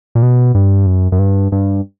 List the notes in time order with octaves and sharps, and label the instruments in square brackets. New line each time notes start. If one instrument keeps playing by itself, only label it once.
[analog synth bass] A#2
B2
G2
F#2
F#2
G2
G2